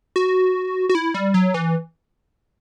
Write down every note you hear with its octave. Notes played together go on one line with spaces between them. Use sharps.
F#4
F#4
E4
G3
F#3
E3